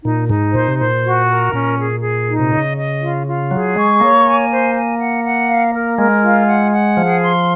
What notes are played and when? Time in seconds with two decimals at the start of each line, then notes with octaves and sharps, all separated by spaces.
0.04 A#2 D#4
0.29 G#2 D#4
0.54 A#2 C5
0.68 C3
0.79 A#2 C5
1.04 F#4
1.29 A#4
1.53 A#2 C#4
1.78 G#4
2.02 G#4
2.28 D#4
2.40 C3
2.52 C#3 D#5
2.76 D#5
3.01 F4
3.26 F4
3.51 F#3 G#4
3.75 G#3 C#6
4.00 A#3 C#5
4.25 G#5
4.50 C5
4.75 G#5
4.99 F#5
5.23 F#5
5.49 F5
5.73 A#4
5.98 G#3 A#4
6.23 F4
6.47 F#5
6.72 F#5
6.97 F3 G#4
7.22 C6